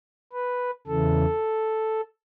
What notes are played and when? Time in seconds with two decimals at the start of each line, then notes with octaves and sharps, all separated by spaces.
0.33 B4
0.87 E2 C#3 E3 A4